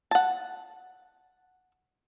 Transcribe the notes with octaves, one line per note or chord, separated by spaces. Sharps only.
F#5 A5